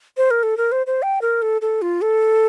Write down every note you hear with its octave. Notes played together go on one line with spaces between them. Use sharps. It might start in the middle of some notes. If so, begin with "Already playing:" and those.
C5
A#4
A4
A#4
C5
C5
G5
A#4
A4
A4
F4
A4